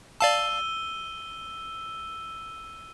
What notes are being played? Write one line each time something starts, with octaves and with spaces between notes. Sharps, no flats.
D5 F5 A5 E6 D#7 G7